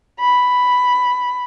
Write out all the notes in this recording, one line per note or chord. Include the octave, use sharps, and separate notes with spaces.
B5